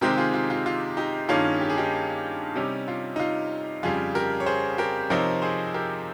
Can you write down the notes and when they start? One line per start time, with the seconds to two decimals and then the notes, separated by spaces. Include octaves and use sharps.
0.01 C3 D#3 G#3 C4 D#4 G4 A#4
0.17 F4 G#4
0.34 F4
0.50 F4
0.66 F4
0.97 D#4 G4
1.29 G2 D#3 A#3 C#4 F4 G#4
1.61 G4
1.70 G#4
1.78 D#4 G4
2.56 C3 G3 C#4 D#4
2.88 F4
3.16 D#4
3.19 F4
3.83 F2 C#3 G3 F4 G#4
4.15 G4 A#4
4.40 C#5
4.46 G#4 C5
4.78 G4 A#4
5.10 C3 F3 C4 D#4 A#4 C#5
5.42 G#4 C5
5.74 G4 A#4